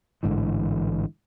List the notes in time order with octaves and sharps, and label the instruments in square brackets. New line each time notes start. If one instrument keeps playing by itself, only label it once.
[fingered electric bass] A1 G#2 D3 E3